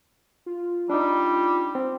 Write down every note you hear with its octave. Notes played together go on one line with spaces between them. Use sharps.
F4
G3 D4 D#4
C4